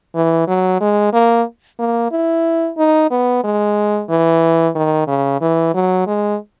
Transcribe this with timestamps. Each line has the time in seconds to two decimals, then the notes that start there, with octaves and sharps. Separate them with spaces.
0.15 E3
0.48 F#3
0.81 G#3
1.13 A#3
1.79 A#3
2.11 E4
2.78 D#4
3.11 B3
3.44 G#3
4.09 E3
4.75 D#3
5.07 C#3
5.41 E3
5.74 F#3
6.07 G#3